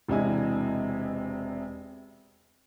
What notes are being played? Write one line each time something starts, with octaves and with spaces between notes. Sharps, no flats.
E1 C3 D4 E4 D#5 G#5